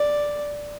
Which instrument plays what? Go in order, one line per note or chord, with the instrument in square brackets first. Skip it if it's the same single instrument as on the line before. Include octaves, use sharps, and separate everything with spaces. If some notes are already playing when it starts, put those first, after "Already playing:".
Already playing: [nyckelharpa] D5